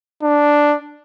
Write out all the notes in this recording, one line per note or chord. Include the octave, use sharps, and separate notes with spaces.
D4